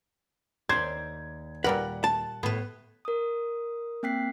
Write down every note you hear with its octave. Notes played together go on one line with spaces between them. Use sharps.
D#2 C5 D5 G#6
A#2 G3 A#4 B4 F#5
A5
A2 B3 B4
A#4 D#6
A#3 C4 G5 F#6 B6 C7